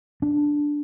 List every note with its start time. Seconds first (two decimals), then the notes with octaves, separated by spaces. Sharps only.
0.22 D4